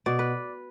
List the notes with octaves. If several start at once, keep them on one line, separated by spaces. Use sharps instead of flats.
B2 D5
B4